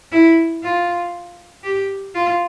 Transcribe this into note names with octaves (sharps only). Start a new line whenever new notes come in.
E4
F4
G4
F4